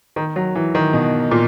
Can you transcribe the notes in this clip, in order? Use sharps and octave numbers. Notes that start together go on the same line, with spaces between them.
D#3
F#3
E3
D#3
B2
A#2